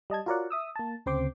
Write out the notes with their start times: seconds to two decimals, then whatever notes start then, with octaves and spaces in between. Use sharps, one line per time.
0.10 G3 D#5 A5 G#6
0.26 F4 F#4 A#4 C#5 D5 F#5
0.51 E5 D#6 E6
0.76 A#3 A5
1.06 D2 C#3 C4 C5 C6 D6